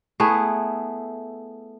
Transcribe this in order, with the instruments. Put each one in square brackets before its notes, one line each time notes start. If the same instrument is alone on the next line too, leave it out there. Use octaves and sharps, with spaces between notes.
[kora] A3 B3 E4 G#4